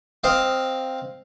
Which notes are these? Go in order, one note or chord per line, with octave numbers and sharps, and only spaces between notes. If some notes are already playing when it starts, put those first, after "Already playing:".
C4 D#5 F5